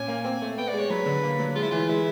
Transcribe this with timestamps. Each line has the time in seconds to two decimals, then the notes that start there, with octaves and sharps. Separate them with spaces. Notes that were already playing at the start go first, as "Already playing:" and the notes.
Already playing: A#2 C#4 G#5
0.08 A#3
0.24 C4
0.42 A3
0.58 B3 G5
0.68 D5
0.73 G#3
0.79 C#5
0.90 F#3 B4
1.06 D3
1.23 A#3
1.39 F#3
1.55 G#3 F4
1.63 E4
1.71 E3 F4
1.88 G#3 E4